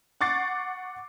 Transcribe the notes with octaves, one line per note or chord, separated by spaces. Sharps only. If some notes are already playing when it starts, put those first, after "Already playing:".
F#5 C#6 D6 A6 C7